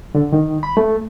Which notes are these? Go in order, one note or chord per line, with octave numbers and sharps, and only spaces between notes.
D3
D#3
B5
A3